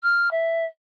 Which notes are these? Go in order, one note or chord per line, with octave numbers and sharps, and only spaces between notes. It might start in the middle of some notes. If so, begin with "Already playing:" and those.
F6
E5